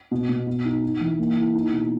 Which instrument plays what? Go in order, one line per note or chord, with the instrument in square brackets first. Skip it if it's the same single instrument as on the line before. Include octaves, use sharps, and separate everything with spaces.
[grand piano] B2
B2
B2
D#4
D#4
E3
A#3
E4
D#4
B2